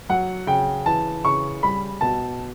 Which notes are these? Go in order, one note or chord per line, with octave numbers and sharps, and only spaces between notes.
F#3 F#5
C#3 G5
E3 A5
C#3 C#6
G3 B5
B2 A5